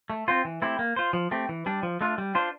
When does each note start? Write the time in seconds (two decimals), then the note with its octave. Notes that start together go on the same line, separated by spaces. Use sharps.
0.10 A3
0.28 C4 F4 C5
0.45 E3
0.62 A3 C4 E4 G4
0.79 A#3
0.96 F4 C5
1.13 F3
1.31 A3 C4 G4
1.49 E3
1.66 G3 D4
1.83 F3
2.01 A3 D4 F4
2.18 G3
2.35 D4 F4 C5